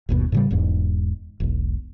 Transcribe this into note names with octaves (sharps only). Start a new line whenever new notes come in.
G1 D#2 B2
A2 C#3 G3
E1 E2 G#2
E1 B1